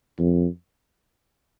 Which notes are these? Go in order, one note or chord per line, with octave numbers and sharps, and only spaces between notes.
F2